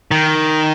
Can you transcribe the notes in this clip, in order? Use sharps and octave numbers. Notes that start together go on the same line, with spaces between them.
D#3